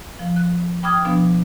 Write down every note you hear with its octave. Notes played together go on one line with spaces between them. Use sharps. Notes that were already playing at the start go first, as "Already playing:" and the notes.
F3
F#6
G5 B5 D6 D#6 F6 G#6
B2 F3 B3 D4